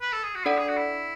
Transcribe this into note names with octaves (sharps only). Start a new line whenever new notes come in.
B4
A4
G#4
F#4
D4 E4 A4 D5 F#5
G#4
F#4
E4